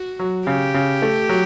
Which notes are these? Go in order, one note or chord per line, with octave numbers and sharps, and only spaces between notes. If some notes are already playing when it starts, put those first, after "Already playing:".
Already playing: F#4
F#3
C#3 G4
C#3
A3
F#3